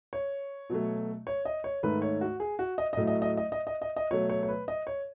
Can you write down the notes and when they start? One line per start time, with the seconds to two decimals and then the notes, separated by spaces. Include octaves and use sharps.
0.13 C#5
0.70 B2 F#3 A3
1.27 C#5
1.45 D#5
1.64 C#5
1.83 G#2 D#3 A3 B4
2.02 C#5
2.21 F#4
2.40 G#4
2.59 F#4
2.78 D#5
2.93 D#5
2.97 A2 F#3 A3
3.07 D#5
3.22 D#5
3.37 D#5
3.52 D#5
3.67 D#5
3.82 D#5
3.96 D#5
4.11 B2 F#3 A3 C#5
4.30 C#5
4.43 C#5
4.48 B4
4.68 D#5
4.87 C#5